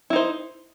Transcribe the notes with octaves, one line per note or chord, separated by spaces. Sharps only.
D#4 E4 C5